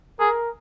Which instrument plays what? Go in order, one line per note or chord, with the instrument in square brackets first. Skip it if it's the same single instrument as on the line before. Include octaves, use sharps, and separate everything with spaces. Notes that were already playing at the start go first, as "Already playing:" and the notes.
[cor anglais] G#4 [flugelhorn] A#4